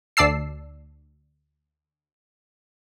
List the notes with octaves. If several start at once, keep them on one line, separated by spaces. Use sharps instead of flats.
D2 D5 A5 E6 C7